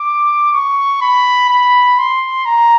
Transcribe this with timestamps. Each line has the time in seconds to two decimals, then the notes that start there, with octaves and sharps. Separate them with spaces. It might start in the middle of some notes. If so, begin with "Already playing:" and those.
Already playing: D6
0.53 C#6
1.01 B5
1.50 B5
1.98 C6
2.45 A#5